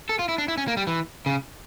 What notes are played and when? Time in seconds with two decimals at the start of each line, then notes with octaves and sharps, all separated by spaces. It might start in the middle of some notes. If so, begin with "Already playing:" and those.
0.09 A4
0.19 F4
0.29 E4
0.38 D4
0.48 E4
0.58 C#4
0.68 A#3
0.77 G3
0.87 E3
1.26 C#3